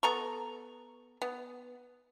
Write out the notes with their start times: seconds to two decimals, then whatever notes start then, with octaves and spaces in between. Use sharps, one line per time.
0.03 B3 A4 A#5 C#6
1.22 B3